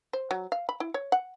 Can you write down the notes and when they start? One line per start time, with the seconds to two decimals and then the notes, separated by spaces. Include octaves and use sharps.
0.13 C5
0.31 F#3
0.52 F5
0.69 B5
0.80 E4
0.94 C#5
1.12 F#5